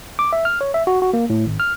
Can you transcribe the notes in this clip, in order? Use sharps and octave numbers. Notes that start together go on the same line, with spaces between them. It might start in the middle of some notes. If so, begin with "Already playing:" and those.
D6
E5
F6
C#5
E5
F#4
F#4
A#3
A2
G#1
F6